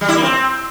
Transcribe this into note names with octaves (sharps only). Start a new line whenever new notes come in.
G3
E4
A#3
C4